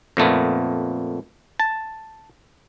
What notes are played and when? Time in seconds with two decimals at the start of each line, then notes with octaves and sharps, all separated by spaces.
0.17 F2 A#2 A3 B3
1.60 A5